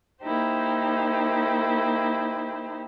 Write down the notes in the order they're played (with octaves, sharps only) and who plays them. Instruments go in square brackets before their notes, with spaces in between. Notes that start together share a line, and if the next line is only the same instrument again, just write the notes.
[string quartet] A#3 D#4 E4 G4 C5